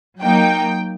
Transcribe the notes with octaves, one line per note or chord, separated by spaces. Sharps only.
F#3 A#3 D#4 G5